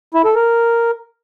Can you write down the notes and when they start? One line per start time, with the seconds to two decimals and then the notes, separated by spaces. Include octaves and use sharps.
0.14 E4
0.25 A4
0.35 A#4